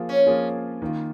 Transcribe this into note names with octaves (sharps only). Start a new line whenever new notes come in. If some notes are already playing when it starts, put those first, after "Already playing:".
Already playing: F3 A#3 F4 G#4
C#4
F3 A#3 F4 G#4
D#3 A#3 F4